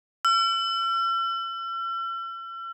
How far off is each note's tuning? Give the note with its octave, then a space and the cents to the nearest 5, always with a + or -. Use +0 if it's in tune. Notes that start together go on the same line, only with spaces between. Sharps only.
E6 +45